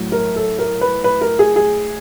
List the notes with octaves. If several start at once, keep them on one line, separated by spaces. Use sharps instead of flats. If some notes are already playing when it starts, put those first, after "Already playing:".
Already playing: A2 F#3
A#4
A4
A#4
B4
B4
A#4
G#4
G#4